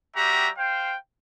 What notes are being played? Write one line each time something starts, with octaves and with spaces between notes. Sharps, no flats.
G3 F#4 G4 E5 A#5
C5 F5 G5